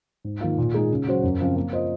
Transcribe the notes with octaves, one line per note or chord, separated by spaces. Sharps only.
G#2
D#3 A#3 F4
A#2
G#3 D#4 G#4
C#3
F#3 C#4 F#4 C5
F#2
C#3 F3 C4 F4
A#3
F4 C5 D#5